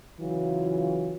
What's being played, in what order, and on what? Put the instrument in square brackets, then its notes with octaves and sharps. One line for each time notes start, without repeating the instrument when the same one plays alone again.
[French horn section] C#3 E3 F#3 F4